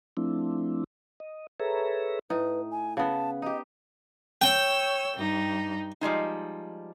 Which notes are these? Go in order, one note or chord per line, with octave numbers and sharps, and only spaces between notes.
F3 A3 C4 D4 E4
D#5
G#4 A4 B4 C#5 E5 A#5
A2 D#4 B4
G#5
C#3 B3 A5
D#4 G4 D#5
C#5 G5 E6
G2 D#4
F3 G3 G#3 D#4